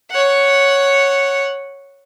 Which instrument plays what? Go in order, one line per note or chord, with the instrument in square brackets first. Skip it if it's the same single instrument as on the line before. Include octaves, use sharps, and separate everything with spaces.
[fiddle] C#5 F#5